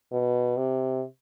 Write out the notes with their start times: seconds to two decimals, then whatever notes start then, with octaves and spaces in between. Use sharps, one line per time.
0.12 B2
0.57 C3